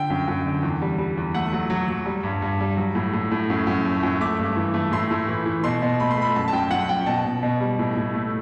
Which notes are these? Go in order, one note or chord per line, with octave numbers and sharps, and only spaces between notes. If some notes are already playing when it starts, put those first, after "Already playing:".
Already playing: D3 G5
F#2
F#2
D3
E2
G3
G3
E2
A3 F#5
F#3
F#3
F#3
G3
G2
G2
G3
F#3
A2
A2
A2
F#2
F#2
A3
F#2
A3 D6
G2
E3
A3
A2 C6
A2
E3
E3
B2 C6
B2
A3 B5
C6
A3 B5
F#2 A5
A5
F#2 G5
F#2 F#5
F#2 G5
B2 A5
B2
B2
G3
A2
A2
A3